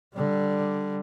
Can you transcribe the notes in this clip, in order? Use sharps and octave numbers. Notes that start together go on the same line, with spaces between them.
D3 G3